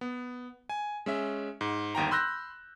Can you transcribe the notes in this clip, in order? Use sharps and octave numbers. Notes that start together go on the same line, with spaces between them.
B3
G#5
G#3 C#4 E5
G#2
G1 D#2 G5 A#5
B5 C6 E6 F#6 G6 A#6